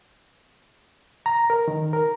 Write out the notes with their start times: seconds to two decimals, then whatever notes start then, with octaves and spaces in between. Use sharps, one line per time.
1.26 A#5
1.50 A#4
1.68 D#3
1.93 A#4